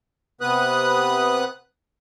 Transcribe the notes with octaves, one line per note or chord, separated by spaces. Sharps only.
C3 B3 B4 D#6 F#6